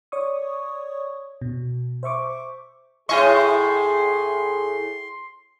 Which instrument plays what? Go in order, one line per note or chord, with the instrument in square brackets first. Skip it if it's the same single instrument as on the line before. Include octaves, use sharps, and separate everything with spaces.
[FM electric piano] C#5 D5 C#6 D#6
B2
C5 E5 C#6 D6
[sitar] A2 E4 D#5 [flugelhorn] G#4 [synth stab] C#5 G#5 C#6 [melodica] C6